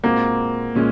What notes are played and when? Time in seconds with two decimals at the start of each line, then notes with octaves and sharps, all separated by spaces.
0.04 A#2 G#3 A#3 C4 F#4
0.75 A#2 G#3 C#4